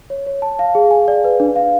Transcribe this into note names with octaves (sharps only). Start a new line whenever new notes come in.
C#5
C#5
A5
F5
G#4
G#5
D5
B4
D4
F5